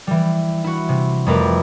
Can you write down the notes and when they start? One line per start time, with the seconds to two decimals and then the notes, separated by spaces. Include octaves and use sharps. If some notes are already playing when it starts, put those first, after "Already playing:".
0.07 E3 G3
0.64 E4 F#4
0.89 C3
1.26 F2 G3 A3 A#4 B4 D6